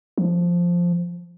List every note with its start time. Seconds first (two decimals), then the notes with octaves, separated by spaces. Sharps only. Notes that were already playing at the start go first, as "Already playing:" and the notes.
0.18 F3